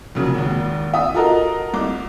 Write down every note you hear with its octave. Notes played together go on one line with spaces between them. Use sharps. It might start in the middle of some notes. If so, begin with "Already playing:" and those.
F2 A#2 C#3 F#3
G#1 D#2
E5 D#6
F4 F#4 A4 A#4 D#5
C2 D6